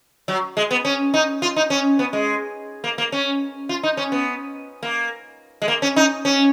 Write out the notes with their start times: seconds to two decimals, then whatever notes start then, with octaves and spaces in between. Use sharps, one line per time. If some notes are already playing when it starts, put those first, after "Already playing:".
0.28 F#3
0.57 G#3
0.71 B3
0.85 C#4
1.14 D#4
1.42 F4
1.56 D#4
1.70 C#4
1.99 B3
2.13 G#3
2.84 A#3
2.98 A#3
3.12 C#4
3.69 F4
3.83 D#4
3.97 C#4
4.12 B3
4.83 A#3
5.62 G#3
5.68 A#3
5.82 C#4
5.96 D#4
6.25 C#4